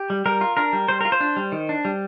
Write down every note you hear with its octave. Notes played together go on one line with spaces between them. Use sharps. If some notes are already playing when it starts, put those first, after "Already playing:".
Already playing: G4
G3
G3 A#4
F4
D4 A#4
G3
G3 C5
F4 A#4
C5
D4
G3
D#3
D4
G3